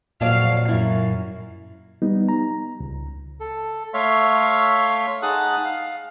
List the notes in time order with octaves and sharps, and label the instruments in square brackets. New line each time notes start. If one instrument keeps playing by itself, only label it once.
[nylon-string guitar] F2 F#3 D5 [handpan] A#2 [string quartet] F5
[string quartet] F#2 [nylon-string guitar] E4
[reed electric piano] G3 B3 D#4
A#5
C#2
[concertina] A4
A3 C#5 E5 F5 C6
D#4 G#4 F#5 A5 D#6 F#6
F5